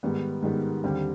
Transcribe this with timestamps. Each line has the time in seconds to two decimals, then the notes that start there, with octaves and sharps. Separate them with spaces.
0.03 G#2 D#3 G3 B3
0.43 G#2 D#3 G3 B3
0.84 D#2 D3 G3 C4